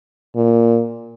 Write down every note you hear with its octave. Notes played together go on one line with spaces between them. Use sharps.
A#2